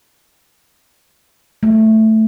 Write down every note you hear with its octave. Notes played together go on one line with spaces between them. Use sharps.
A3